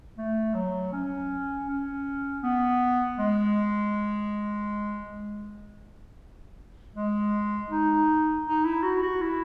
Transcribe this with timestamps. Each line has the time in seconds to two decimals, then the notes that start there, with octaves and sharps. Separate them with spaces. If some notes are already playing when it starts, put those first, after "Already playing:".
0.18 A3
0.54 F#3
0.93 C#4
1.67 C#4
2.43 B3
3.18 G#3
6.95 G#3
7.70 D#4
8.46 D#4
8.64 E4
8.83 F#4
9.03 F#4
9.22 E4